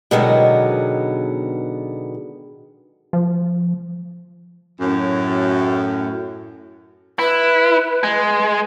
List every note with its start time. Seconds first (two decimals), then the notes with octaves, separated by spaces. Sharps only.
0.11 B2 D3 D#3 F#3 G#3 B3
3.13 F3
4.81 F#2 A2
7.19 E4 B4
8.03 G#3